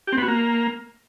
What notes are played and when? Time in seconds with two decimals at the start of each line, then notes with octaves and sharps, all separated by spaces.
0.07 G4
0.12 C4
0.18 B3
0.23 F#4
0.28 A#3